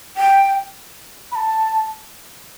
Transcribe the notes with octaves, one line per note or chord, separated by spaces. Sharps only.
G5
B5
A5